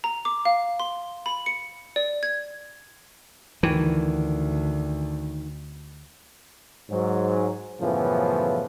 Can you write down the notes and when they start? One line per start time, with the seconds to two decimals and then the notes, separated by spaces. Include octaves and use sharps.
0.04 A#5
0.25 D6
0.45 F5
0.80 C6
1.26 B5
1.46 C#7
1.96 D5
2.23 G#6
3.63 D2 D#3 E3
6.90 G#2 F#3
7.80 F#2 A2 C#3 E3 F3 B3